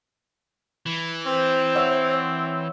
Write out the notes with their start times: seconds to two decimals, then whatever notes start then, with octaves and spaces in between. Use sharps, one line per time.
0.86 E3
1.27 C4 C5
1.75 C#5 E5 F#5